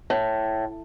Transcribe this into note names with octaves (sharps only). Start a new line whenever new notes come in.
A2